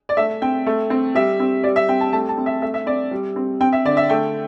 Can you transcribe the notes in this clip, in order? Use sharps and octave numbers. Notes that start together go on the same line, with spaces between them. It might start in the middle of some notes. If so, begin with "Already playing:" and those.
D5
A3 E5
C4 G5
A3
C4
G3 E5
C4
G3 D5
E5
C4 G5
A5
A3 A5
A5
C4
E5
A3 E5
E5
C4 D5
G3
C4
C4 G5
E5
D3 D5
E5
A3 G5